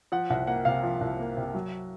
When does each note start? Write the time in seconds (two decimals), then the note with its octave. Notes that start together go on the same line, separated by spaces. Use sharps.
0.12 F3 F#5
0.30 C2 F#5
0.47 A#3 F#5
0.65 C3 F5
0.83 F3
1.01 C2
1.19 A#3
1.37 C3
1.54 F#3